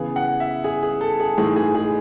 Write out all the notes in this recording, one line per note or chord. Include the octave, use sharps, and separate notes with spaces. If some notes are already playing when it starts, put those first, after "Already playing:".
Already playing: C#3 E3 B3 G#4
F#5
E5
G#4
G#4
A4
G#4
A2 E3 G#3 D#4 G#4
G#4
G#4